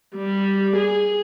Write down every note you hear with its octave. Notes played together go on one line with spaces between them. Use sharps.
G3
G#4